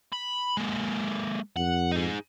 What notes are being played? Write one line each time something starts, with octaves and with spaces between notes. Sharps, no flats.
B5
G#3 A#3
F2 F#5
D#4 G#4